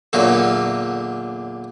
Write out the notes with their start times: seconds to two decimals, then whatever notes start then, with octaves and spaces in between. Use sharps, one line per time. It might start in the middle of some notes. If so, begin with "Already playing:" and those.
0.13 E2 A#2 D3 F#3